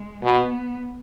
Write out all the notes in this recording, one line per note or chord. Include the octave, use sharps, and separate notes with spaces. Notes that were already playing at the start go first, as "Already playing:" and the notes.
Already playing: G#3
B2 B3